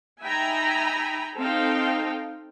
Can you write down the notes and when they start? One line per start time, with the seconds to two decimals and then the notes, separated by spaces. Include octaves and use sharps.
0.22 D#4 E5 G5 G#5 A#5 B5
1.38 C4 D#4 A4 F5 G5